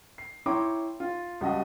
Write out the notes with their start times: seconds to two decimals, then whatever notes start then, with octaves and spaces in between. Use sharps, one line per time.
0.18 C7
0.46 E4 C#5 G5 A#5 C6 D6
1.00 F4
1.41 C#2 G3 F#4 D#5 A5